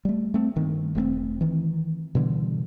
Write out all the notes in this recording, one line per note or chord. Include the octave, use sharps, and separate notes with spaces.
G3 A3
A3 C4
G2 D#3
E1 A3 A#3 C4
D#3 E3
B2 D3 E3 G3